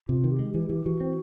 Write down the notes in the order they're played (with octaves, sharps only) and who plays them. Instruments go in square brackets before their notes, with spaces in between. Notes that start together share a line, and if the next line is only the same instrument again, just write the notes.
[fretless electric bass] C3 [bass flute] F4
[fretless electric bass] D#3
[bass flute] G4
[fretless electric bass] G#3
[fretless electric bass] E3 [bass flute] G4
[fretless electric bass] E3 [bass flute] G4
[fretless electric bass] E3 [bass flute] F#4
[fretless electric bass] C4